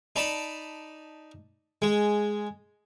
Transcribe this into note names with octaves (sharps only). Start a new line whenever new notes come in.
D#4 D5 A5 B5
G#3